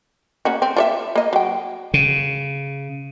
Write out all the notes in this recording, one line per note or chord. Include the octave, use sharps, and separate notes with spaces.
A#3 C#4 F#4
C4
F4 C#5 E5
A#3 D#5
F#3 G5
C#3